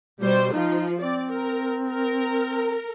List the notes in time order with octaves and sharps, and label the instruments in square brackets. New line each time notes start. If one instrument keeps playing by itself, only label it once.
[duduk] B2 [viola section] G3 C5
[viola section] F3 F4 [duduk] D#4
[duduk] C4 [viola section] D5
[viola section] A#4
A#4